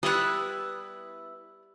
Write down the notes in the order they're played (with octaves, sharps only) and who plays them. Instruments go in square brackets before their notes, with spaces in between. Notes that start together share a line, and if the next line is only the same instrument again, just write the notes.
[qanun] G3 [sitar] B3 E4 B4 [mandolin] D#6 F#6